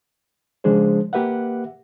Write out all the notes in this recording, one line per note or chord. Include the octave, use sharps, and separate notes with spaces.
C#3 F3 G#3 D4 G#4 C5
A#3 G4 B4 E5 F#5